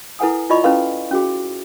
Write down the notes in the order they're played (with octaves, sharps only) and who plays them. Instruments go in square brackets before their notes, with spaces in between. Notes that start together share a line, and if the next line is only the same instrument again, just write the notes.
[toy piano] E4 A4 B4 F#5 G#5 D#6
E4 F4 D5 D#5 B5 C#6
C#4 E4 A4 B4 F5 C6
C#4 F#4 G#4